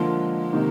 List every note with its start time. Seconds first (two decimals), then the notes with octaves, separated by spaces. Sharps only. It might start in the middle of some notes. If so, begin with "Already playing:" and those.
Already playing: D3 F3 G#3 A#3 F4
0.52 C3 D#3 A#3 D#4